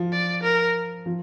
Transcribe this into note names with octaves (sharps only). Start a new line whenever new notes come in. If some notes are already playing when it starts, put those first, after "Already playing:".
Already playing: F3
D5
A#4
F3